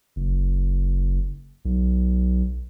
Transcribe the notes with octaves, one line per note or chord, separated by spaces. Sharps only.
F#1
B1